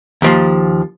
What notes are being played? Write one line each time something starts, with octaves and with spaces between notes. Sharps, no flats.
D#2 F3 C6